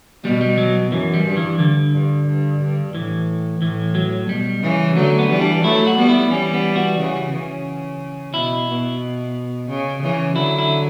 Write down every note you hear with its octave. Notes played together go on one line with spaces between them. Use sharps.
B2 G3
G3
F#3
F#2 E3
G3
G2
E3
D3
G2
G2
G2
A2 E3
A2 E3
F#3
B2 G3
C#3 E3
D3 F#3 A3
B3
E3 G3
D4
F#3 A3 E4
F#4
G3 B3
E4
E3 G3 C#4
B3
F#4
C#3 E3
C#3
B2 E4
B2
C#3
C#3 E3
D3 F#3 E4
E4